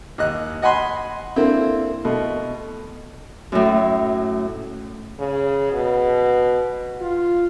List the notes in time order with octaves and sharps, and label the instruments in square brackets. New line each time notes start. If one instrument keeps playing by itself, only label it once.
[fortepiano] D#2 D#5 F#6
D#5 F#5 G#5 B5 C6
D3 A#3 C4 E4
B2 A3
[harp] F#2 A2
[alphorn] C#3
B2
F4